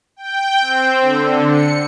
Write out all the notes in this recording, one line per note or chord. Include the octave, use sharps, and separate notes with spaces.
G5
C4
D3
C#7